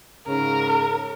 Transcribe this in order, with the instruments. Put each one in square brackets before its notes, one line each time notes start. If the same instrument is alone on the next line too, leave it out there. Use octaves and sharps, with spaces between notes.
[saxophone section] G#2 C#3 [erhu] A#4